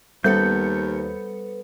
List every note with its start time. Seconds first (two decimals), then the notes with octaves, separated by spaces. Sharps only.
0.24 D#2 G3 B3 A4 B4 C5 G6 C#7